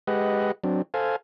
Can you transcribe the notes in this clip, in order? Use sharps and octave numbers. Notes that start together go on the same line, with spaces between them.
G#3 G4 B4 D#5 F#5
F#3 C4 D4
A4 C5 F5 G#5